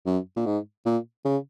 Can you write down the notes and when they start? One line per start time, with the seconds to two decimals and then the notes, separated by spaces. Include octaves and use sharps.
0.06 F#2
0.37 A#2
0.46 G#2
0.86 A#2
1.25 C#3